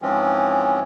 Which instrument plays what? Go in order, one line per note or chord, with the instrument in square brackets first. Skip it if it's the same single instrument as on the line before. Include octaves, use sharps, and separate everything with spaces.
[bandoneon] G#2 E3 F3 G#3 C4 C#4